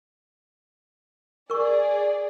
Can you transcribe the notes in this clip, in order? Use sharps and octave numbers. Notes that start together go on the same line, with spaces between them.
G#4 A#4 D5 C#6